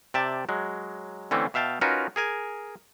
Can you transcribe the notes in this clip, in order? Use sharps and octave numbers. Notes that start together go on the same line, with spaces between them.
C3 D5 E5 G5 A5
F#3 G#3
D3 E3 A3 C4 C#4
B2 E5 F5 G5 A5
C#4 D#4 F4 F#4 A#4 B4
G#4 A#4 G#5